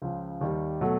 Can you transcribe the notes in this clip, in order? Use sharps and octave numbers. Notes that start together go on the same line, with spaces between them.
C#2 C#3 F3
D#2 D#3 G3
B2 F#3 A3